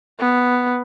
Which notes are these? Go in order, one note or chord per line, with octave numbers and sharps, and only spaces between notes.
B3